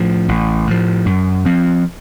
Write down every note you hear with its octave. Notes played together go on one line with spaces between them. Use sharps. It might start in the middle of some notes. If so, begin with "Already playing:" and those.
Already playing: A2 F3
A1
A2 F3
F#2
F3 C4